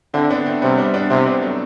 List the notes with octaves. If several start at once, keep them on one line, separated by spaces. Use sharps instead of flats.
D3 C4 E4
B3 D4
A3 C4
C3 G3 B3
G3 B3
B3 D4
C3 C4 E4
B3 D4
F#3 A3